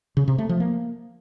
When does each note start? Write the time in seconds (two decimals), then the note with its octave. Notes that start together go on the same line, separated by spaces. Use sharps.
0.17 C#3
0.28 C3
0.38 A3
0.49 F3
0.60 A#3